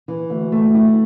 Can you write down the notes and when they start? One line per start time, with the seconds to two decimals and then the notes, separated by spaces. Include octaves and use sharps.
0.08 E3
0.30 D2
0.52 A3
0.74 E4